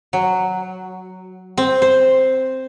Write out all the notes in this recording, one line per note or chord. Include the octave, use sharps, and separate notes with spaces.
F#3
C4
C5